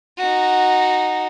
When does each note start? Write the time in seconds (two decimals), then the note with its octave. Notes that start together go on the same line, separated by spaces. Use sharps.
0.18 D#4 F#4